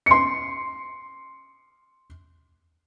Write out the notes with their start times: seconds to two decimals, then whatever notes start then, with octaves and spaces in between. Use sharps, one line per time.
0.06 C6 C#7